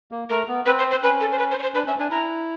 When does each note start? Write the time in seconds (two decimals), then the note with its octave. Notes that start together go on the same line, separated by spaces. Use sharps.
0.12 A#3
0.30 A3 A#4
0.48 B3
0.66 C4 B4
0.79 C5
0.91 C5
1.03 C#4 B4
1.21 A4
1.32 C5
1.39 B4
1.51 C5
1.59 C#5
1.62 C5
1.74 D4 B4
1.87 C#4 E5
1.99 D4 G#5
2.11 E4 A#5